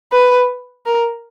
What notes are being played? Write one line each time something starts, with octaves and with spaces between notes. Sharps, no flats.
B4
A#4